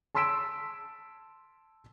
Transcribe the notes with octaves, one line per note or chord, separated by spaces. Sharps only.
A5 C6 E6 B6 D7 E7